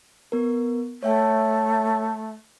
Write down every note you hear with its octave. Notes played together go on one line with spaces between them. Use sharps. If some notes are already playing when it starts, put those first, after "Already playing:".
B3 A#4
A3 C#5 E5 G5